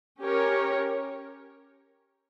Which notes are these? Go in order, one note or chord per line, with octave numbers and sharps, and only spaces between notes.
C#4 G4 A#4 C#5